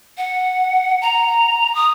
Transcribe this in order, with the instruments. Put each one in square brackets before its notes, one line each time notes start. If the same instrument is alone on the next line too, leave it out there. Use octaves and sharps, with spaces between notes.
[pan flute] F#5
A#5
D#6